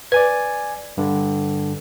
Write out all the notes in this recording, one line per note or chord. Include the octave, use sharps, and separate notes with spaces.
B4 D5 G#5 G#6
G2 D3